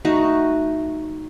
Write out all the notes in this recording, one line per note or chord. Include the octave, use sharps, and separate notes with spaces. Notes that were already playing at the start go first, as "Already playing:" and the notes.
A3 D#4 F#4 D#5